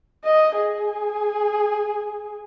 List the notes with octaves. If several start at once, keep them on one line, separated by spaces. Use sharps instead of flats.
D#5
G#4